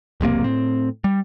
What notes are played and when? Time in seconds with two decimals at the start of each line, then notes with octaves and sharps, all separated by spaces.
0.21 E1 B1 C3 A#3
0.44 A2 C4
1.04 G3